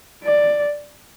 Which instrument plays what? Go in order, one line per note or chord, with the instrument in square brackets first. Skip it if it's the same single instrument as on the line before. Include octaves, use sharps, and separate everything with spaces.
[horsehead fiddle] D5